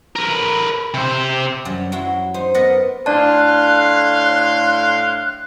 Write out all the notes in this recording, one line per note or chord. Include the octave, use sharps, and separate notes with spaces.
A#4 B4
C3 C5
F#2 F#3 G3
F#3 E4 F#4 C6
D#4 C5
B3 A#4 D5 D#5 F#5
A2 D4 D5 F5 A5 C6 F#6